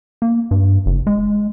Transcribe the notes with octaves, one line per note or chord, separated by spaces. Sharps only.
A#3
G2
F#1
G#3